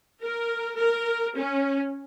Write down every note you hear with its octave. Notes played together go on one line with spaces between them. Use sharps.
A#4
A#4
C#4